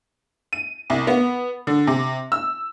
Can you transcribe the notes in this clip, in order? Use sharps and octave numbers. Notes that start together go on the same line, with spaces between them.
D#7
C2
B3
D3
C3
E6